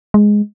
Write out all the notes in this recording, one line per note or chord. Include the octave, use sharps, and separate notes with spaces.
G#3